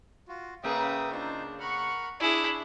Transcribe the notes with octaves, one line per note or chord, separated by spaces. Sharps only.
F4 F#4
C#3 A#3 G#4 B4 E5 G5 D#6
D4 D#4 F4 C5
A#4 F#5 B5 C#6 F6
D4 E4 G#4 E6